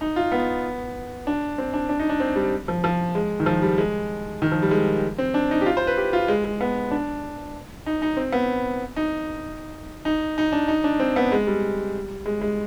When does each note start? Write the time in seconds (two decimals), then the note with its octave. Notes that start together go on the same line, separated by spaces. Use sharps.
0.01 D#4
0.16 F4
0.32 B3
1.27 D4
1.58 C4
1.73 D4
1.89 D4
1.99 D#4
2.09 D4
2.20 C4
2.36 G3
2.68 F3
2.84 F3
3.15 G#3
3.40 D#3
3.46 F3
3.62 G3
3.78 G#3
4.42 D#3
4.52 F3
4.62 G3
4.71 G#3
5.18 C4
5.34 D4
5.51 D#4
5.61 G4
5.66 F4
5.77 C5
5.87 B4
5.97 G4
6.13 F4
6.28 G#3
6.44 G#3
6.61 B3
6.91 D4
7.86 D#4
8.02 D#4
8.17 C4
8.33 B3
8.96 D#4
10.05 D#4
10.38 D#4
10.52 D4
10.68 D#4
10.84 D4
11.00 C4
11.16 B3
11.32 G#3
11.47 G3
12.26 G#3
12.41 G#3